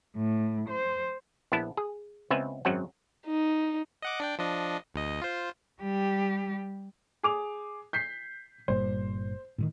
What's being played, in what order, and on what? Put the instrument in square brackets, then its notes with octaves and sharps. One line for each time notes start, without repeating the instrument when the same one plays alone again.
[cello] A2
C5
[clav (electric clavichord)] A#1 B3 E4 A5
G#4
C#2 B3 C4 B4 E5 G#5
G#1 F#2 F#3 C4 F#5
[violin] D#4
[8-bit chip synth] D#5 F#5 D6
D4 D5 G5
F3 D4 D#5
D2 D#5
F4 C5
[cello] G3 G4
[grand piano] G#4 D6 F7
G6 B6 C7
[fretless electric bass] G1 G2 A#2 [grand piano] C5
[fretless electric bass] A2 D3 D#3